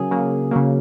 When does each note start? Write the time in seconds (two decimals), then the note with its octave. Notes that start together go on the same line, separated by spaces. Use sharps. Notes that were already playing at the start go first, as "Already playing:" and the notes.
Already playing: C#3 F#3 A#3 G#4
0.11 C#3 F#3 A#3
0.51 C#3 F#3 A#3